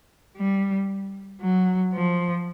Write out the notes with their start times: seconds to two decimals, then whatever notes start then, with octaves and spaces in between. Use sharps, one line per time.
0.37 G3
1.42 F#3
1.94 F3